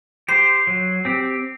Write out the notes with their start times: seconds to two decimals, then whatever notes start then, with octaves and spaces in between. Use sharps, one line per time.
0.28 G4 C5 C7
0.67 F#3
1.05 C4 G4